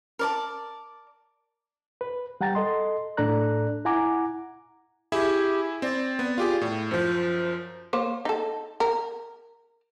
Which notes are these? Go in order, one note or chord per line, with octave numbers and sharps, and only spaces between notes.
A#4 D5 A5
B4
G3 F#5 G5 A#5 A6
A4 D#5 C6
A2 D4 A4 D5 A#5 F#6
E4 F#5 G#5 A#5 D6
E4 G4 G#4 E5
C4 D5
B3
F4 G4 G#4
A2
F#2 F3 C5
A#3 C5 C#5
D#4 A4
A#4